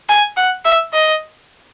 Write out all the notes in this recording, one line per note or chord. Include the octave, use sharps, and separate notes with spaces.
G#5
F#5
E5
D#5